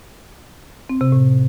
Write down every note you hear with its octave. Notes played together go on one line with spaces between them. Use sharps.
C4
C3
A2